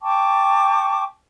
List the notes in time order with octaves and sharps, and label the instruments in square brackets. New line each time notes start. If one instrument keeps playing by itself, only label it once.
[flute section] G5 A5 C#6 D6